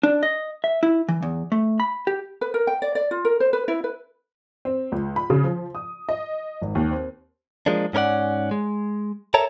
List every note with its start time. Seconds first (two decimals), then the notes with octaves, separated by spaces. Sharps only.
0.03 D4
0.23 D#5
0.64 E5
0.83 E4
1.09 E3
1.22 E2
1.52 A3
1.80 B5
2.07 G4
2.41 B4
2.54 A#4
2.67 G5
2.82 D5
2.95 D5
3.11 F4
3.25 A#4
3.40 C5
3.53 B4
3.68 E4
3.84 B4
4.65 C4
4.92 C#2
5.16 B5
5.30 C#3
5.44 F3
5.75 D#6
6.09 D#5
6.62 G#1
6.75 D#2
6.91 C4
7.66 F3 G#3 A#3 D4
7.93 G#2 C#4 A#4 D5 F#5
8.51 G#3
9.34 A4 A#4 C#5 E5 A5 A#5